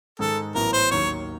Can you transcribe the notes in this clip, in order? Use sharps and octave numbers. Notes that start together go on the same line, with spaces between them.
G#2 D#3 G#3 A4
A1 A2 F#3 B3 E4 A#4
C5
D#2 D#3 F#3 A#3 C#5